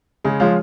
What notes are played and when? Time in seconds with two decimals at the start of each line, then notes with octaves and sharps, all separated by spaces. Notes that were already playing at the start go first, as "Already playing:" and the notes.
0.24 C#3 G#3
0.40 F3 G#3 C#4 F4